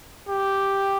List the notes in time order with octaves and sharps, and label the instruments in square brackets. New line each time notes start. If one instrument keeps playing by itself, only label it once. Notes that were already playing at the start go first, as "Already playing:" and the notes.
[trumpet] G4